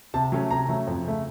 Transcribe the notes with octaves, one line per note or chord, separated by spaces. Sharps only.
C3 A5
F#3 A3 C#4
C3 A#5
F#3 A3 C#4
F2
C#3 A3